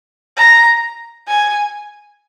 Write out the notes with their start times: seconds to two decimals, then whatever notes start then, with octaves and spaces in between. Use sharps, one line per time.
0.37 A#5
1.27 G#5